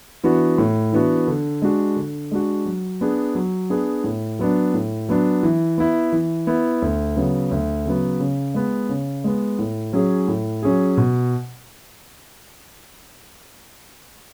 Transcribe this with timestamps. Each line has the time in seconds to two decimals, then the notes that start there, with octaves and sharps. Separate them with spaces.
0.24 E3 B3 D4 F#4
0.58 A2
0.93 E3 B3 D4 F#4
1.27 D3
1.62 G#3 D4 F#4
1.96 D3
2.31 G#3 D4 F#4
2.66 F#3
3.01 B3 D4 G#4
3.35 F#3
3.70 B3 D4 G#4
4.04 A2
4.39 F#3 B3 D4
4.74 A2
5.09 F#3 B3 D4
5.43 E3
5.78 B3 E4
6.12 E3
6.47 B3 E4
6.82 D2
7.16 C#3 F#3 B3
7.51 D2
7.85 C#3 F#3 B3
8.20 C#3
8.54 G#3 B3
8.89 C#3
9.24 G#3 B3
9.59 A2
9.93 F#3 C#4 G#4
10.28 A2
10.63 F#3 C#4 G#4
10.97 B2